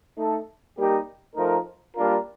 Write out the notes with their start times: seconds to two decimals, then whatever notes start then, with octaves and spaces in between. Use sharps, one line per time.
0.18 A3 D#4 A4
0.77 G3 A#3 D#4 G4
1.36 F3 A3 D#4 A#4
1.96 G3 A#3 D4 F4 A#4